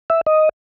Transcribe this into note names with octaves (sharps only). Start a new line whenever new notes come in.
E5
D#5